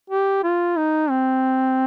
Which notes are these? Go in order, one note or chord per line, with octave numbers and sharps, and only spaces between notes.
G4
F4
D#4
C4